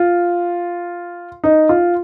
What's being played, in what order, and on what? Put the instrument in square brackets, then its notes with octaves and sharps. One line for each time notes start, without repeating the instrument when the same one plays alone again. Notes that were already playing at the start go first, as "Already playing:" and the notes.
Already playing: [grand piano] F4
D#4
F4